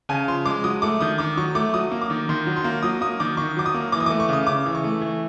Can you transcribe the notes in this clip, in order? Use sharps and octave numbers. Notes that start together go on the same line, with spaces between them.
C#3 G#5
F3 C6
G#3 D6
F#3 D#6
A3 D6
D#3 D#6
D#3 D6
F#3 C#6
A3 D6
F#3 D#6
A#3
D6
D#3
D#3 C6
F#3
C6
A#3
F#3 D#6
A#3 D#6
D#3 D6
D#3 C#6
F#3 D6
D#6
A#3
E3 D6
D#6
D6
A3
C#6
C#3 D#6
C#3 D6
E3
C#6
A3
E3